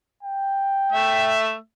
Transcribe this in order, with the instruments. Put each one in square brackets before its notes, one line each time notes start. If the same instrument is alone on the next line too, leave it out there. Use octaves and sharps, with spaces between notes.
[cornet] G5
[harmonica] A3 E5